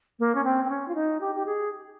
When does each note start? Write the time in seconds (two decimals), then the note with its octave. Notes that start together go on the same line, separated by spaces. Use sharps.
0.19 A#3
0.35 C#4
0.44 C4
0.65 C4
0.69 C#4
0.88 F4
0.95 D#4
1.21 G4
1.35 G4
1.46 G#4